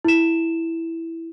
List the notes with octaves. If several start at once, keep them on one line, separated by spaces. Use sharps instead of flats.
E4 E7